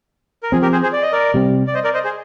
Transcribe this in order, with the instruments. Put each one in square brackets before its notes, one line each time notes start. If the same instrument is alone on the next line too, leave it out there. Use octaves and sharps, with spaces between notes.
[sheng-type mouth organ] A#4
[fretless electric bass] F3 C4 [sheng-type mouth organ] G#4
[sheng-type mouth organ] G4 A#4
G#4 C5
G#4 C5
D5
D#5
A#4 D5
[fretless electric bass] C3 G3 C4
[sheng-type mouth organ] D5
C5 D#5
A#4 D5
C5 D#5
G#4 C5